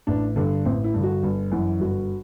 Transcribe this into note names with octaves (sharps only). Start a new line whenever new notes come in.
A1 D4
G2 D3
A1 C4
E4
G2 D3
F#4
G1
F#2 E3
G1 F#4